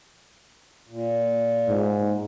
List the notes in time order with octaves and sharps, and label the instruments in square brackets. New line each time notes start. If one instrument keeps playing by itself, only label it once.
[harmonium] A#2
[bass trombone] G#2